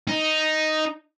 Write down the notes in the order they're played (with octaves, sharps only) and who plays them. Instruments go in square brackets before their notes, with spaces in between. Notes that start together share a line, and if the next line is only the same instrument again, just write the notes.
[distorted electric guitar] D#4